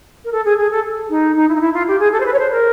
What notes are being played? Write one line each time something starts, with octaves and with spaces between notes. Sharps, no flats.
A#4
A4
G#4
G#4
A4
D#4
D#4
E4
D#4
E4
F4
G4
G#4
A4
C5
B4
C#5
C5
A#4